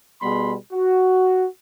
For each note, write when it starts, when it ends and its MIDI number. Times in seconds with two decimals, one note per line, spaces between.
0.22 0.54 47
0.22 0.54 55
0.22 0.54 59
0.22 0.54 68
0.22 0.54 83
0.22 0.54 84
0.72 1.45 66